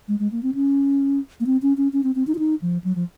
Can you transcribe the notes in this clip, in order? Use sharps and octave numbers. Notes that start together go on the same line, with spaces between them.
G#3
G#3
A#3
C4
C#4
A#3
C4
C#4
C#4
C#4
C4
C4
D#4
F4
D#4
F3
F#3
F3